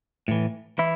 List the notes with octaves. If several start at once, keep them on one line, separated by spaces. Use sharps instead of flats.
A2 E3
E3 E4